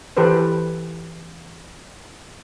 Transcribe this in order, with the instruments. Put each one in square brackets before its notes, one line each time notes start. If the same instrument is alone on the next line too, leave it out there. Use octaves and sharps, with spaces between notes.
[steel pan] E3 G4 A4 B4 C5